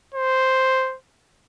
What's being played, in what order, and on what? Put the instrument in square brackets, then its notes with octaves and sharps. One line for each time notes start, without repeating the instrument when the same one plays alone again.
[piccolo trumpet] C5